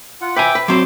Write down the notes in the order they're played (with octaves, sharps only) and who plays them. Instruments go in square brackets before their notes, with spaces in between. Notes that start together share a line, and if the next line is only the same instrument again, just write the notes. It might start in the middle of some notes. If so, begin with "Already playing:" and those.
[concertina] F4 F#5
[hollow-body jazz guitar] B4 G#5 [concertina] E5 G5 D6
[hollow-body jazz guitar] B4
[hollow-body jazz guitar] F#3 C4 C5 [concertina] C6 D6